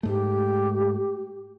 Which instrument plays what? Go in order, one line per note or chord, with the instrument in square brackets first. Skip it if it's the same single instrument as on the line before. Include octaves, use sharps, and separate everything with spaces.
[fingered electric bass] G#2 A3 [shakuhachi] G4